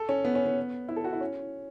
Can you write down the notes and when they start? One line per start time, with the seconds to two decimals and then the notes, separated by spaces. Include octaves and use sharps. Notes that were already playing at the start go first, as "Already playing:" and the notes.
Already playing: A4
0.09 C#4
0.25 B3
0.35 C#4
0.46 B3
0.88 E4
0.96 A4
1.04 F#4
1.13 E4
1.21 C#4